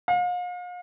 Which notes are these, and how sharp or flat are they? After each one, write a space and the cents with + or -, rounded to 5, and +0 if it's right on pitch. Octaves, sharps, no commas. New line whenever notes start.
F5 +40